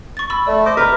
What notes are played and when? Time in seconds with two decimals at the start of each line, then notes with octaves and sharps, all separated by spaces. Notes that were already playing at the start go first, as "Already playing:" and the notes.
0.17 C#6 A6
0.30 B5 E6
0.47 A3 D5
0.66 C5 D#5 D6
0.77 B4 A#5 F6